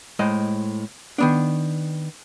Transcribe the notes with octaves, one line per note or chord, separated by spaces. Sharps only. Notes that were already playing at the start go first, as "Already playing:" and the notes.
A2 G#3 C5 D#5
D#3 B3 D4